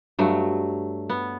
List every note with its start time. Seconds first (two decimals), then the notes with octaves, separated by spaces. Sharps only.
0.19 G2 F#3 A3
1.10 B3